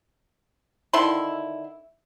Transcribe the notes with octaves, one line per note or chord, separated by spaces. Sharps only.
D3 D#3 E4 C6